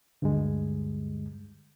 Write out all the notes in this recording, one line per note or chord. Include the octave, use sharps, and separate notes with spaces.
D2 G2 D3 G3 G#3